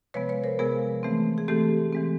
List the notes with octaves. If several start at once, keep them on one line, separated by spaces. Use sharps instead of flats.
C3 F3 G#3 B3 B4 C#5
B4 C#5
A#4 C5
C3 F3 G#3 B3 G#4 A#4
E3 A3 C4
G#4
E3 A3 C4 G4 A4
E3 G#3 C4